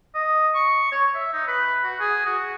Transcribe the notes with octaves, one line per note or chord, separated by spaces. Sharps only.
D#5
C#6
C#5
E5
D#4
B4
F#4
G#4
F#4